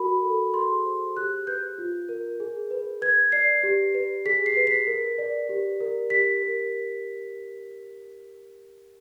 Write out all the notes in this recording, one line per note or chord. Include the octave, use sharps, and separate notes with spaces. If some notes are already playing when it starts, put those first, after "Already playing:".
Already playing: F#4 A#4 B5
A4
G#4 C6
C5
G4 F#6
B4 G6
F4
A#4
G#4
B4
B4 G#6
D5 C7
G4
B4
G#4 B6
C7
B4
B6
A#4
D5
G4
A#4
G4 B6
A#4